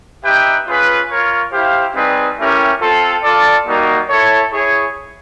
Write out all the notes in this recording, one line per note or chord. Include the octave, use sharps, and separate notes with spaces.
D#4 G4 B4 E5 G5
C#4 F4 G#4 B4
F4 A#4 C#5
E4 G4 C5 F5
G3 C4 D#4 G#4 B4
A3 C#4 E4 G4 A#4
C4 F4 A4
F4 A4 D5
G3 A#3 D#4 F#4
E4 A4 C#5
E4 G#4 C#5